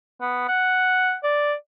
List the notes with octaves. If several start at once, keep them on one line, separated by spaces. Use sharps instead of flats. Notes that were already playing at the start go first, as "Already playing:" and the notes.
B3
F#5
D5